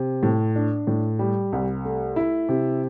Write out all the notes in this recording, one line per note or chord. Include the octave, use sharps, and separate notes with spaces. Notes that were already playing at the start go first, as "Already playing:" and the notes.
Already playing: C3
A2
D4
A2
G3
C2
A3
E4
C3